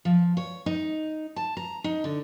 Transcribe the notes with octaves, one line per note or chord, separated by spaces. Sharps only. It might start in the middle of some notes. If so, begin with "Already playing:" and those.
F3
C#5
D#4
A5
A#5
D#4
D3